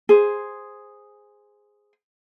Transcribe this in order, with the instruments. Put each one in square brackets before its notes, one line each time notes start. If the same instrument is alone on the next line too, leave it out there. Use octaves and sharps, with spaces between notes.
[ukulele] G#4 C5